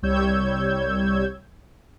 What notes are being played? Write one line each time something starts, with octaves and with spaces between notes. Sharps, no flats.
C2 G3 C#5 E6 G6 G#6